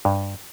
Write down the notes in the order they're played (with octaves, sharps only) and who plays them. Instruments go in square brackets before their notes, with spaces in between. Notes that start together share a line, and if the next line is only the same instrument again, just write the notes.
[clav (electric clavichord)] G2